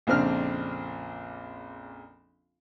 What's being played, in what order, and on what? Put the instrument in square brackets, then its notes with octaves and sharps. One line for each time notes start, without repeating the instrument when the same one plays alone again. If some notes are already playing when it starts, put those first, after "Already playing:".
[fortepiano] A#1 F2 C#3 C4 D4 F6